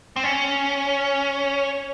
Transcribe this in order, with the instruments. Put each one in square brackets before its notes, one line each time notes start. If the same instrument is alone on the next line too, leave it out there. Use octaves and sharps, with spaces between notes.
[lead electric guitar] C4
C#4